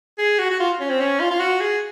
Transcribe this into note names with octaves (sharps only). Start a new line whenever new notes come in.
G#4
F#4
F#4
F4
C#4
C4
C#4
F4
F4
F#4
G#4